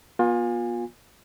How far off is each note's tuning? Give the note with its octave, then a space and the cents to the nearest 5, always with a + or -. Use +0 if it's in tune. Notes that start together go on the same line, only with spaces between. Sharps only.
B3 -40 F4 +30 G#5 -20